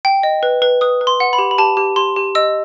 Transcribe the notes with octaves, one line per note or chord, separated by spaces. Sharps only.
G5
D#5
B4
B4
B4 D#6
B4
C6
F#5
B5
G4
B5
G4 A5
G4
G4 C6
G4
D#5 E6